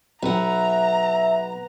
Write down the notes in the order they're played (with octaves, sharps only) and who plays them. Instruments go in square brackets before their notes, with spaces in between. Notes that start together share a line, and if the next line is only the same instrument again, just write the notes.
[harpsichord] B1 [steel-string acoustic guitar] B4 F#5 [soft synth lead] E5 [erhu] A#5